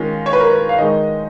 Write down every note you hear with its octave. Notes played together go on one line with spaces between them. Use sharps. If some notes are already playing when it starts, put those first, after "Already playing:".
Already playing: D#3 G#3 C#4 F4
C#5
B4
A#4
B4
F5
D#3 G#3 D#4 D#5